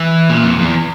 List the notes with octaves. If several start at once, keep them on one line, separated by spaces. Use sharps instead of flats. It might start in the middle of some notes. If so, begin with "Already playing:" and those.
Already playing: E3
A#2
F2
E2